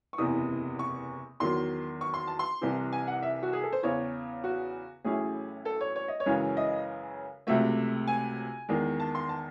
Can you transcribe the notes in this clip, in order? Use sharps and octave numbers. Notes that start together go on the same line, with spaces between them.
C#6
F#1 E2 C3 E3 D#6
C#6
E2 D#3 F#3 C6
C#6
C6
A5
C6
C2 C3 E3
G#5
F#5
E5
F#4
G#4
A4
C5
E2 C#3 E3 C#5
F#4
A1 A2 F#3 C#4 E4 G#4
A4
C#5
C#5
D#5
C#5
F#2 C#3 E3 G#3 C#4
D#5
C#2 C3 F#3 A3 E5
G#5
E2 D#3 G#3
A5
C6
A5